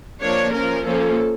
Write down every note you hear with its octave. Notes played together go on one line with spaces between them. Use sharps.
F3 A#3 D4 C#5
F3 C#4 A#4
F3 A#3 C#4 A4